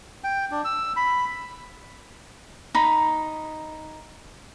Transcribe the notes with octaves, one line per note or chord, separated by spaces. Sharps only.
G5
D4
E6
B5
D#4 B5